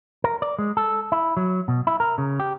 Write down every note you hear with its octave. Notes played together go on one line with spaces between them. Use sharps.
A#4
D5
G#3
A4
E4
F#3
B2
E4
A#4
C#3
G4